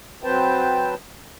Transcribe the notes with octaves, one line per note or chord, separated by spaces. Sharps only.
F#3 C4 B4 C5 G5 A5